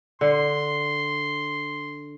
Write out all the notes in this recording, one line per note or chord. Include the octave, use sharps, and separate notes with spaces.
D3 C6